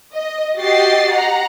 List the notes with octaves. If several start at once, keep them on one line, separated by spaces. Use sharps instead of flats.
D#5
F#4 G4 D#5 A6 C7
F#5 A#5